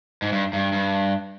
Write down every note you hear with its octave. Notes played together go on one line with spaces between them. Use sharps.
G#2
G2
G2
G2